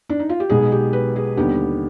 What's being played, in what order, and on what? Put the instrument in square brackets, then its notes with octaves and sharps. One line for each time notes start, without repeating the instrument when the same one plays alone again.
[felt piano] D4
D#4
F4
G4
B1 B2 G#3 B3 G#4
G4
B4
G#4
D#2 D3 G3 B3 G4